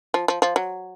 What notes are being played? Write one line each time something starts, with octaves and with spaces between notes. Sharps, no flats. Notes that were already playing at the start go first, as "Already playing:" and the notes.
F3
F3
F3
F#3